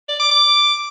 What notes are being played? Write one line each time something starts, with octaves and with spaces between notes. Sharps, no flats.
D5
D6
D6